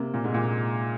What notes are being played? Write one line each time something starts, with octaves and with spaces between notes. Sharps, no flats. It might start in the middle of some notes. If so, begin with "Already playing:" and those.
Already playing: C3 A#3
A#2
G#2
A#2